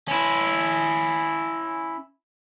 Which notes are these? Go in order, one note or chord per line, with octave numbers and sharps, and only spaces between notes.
C#4 E4